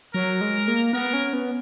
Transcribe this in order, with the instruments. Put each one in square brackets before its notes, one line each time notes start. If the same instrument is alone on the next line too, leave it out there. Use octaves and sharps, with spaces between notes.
[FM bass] F#3 [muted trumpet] A#4
[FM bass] G#3
A#3
[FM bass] B3 [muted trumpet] A#4
[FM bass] C#4
B3